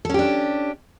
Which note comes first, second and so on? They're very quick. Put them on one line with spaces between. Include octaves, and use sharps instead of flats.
A4 C#4 G4 D4